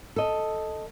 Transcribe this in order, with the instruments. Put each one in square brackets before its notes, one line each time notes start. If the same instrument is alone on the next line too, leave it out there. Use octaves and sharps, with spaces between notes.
[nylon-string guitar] A4 D#5